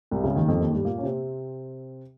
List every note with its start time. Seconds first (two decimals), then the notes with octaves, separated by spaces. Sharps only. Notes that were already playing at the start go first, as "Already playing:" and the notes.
0.11 C2 C3
0.24 C#2 C#3
0.36 D#2 D#3
0.48 F2 F3
0.60 D#2 D#3
0.72 G2 G3
0.85 A#2 A#3
0.98 C#4
1.03 C3 C4